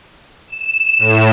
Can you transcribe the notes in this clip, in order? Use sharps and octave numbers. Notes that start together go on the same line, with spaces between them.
E7
A2